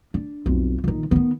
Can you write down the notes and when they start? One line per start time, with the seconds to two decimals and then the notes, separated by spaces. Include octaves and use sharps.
0.14 D4
0.46 B1 F2
0.84 A#1 D#3
1.11 D#3 B3